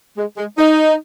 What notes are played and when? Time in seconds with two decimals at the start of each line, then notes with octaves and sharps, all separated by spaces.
0.18 G#3
0.37 G#3
0.57 D#4